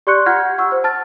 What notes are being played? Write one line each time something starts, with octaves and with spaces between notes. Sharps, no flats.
G4 D5 C6 C#6 F#6 C#7
F4 F#5 F6 G6 G#6
F#5 C#6 E6
C5
A5 F6 A6